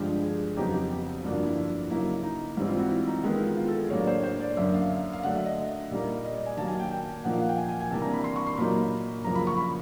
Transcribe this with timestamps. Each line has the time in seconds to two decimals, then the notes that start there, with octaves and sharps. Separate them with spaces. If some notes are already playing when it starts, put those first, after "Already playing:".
Already playing: G2 D3 F3 G#3 G4
0.23 G#4
0.57 F2 C#3 F#3 B3 D#4 G4
0.74 G4
1.23 G2 D3 F3 A#3 D4 F#4
1.46 E4
1.56 E4
1.90 C#3 F#3 A#3 D#4 E4
2.23 D#4
2.57 G#2 E3 G3 C4 E4
2.68 F4
2.79 F#4
2.90 E4
3.07 D#4
3.24 D#3 G#3 B3 E4
3.40 F4
3.57 F4
3.68 A4
3.79 G#4
3.90 A2 F#3 A#3 D4 C#5
4.07 C5
4.23 C5
4.40 D5
4.57 F#2 D3 F#3 A#3 E5
4.74 F5
5.13 F5
5.23 D3 F#3 A3 D4 F#5
5.35 E5
5.46 D#5
5.91 A#2 G3 A#3 D#4
6.25 D#5
6.35 D5
6.46 G#5
6.57 D#3 F#3 A#3 A5
6.68 G#5
6.80 G5
6.91 G5
7.24 A#2 F3 A#3 D#4 F#5
7.33 F5
7.41 F#5
7.49 G5
7.58 G#5
7.69 G#5
7.80 G#5
7.91 C3 E3 G3 A#3 D4 A5
8.02 A#5
8.14 B5
8.24 C6
8.36 C#6
8.47 C6
8.57 A#2 F#3 A#3 D#4 B5
9.24 F#2 C#3 F3 A#3 A#5
9.35 B5
9.47 C#6
9.58 B5